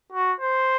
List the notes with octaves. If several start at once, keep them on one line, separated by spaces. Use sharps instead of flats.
F#4
C5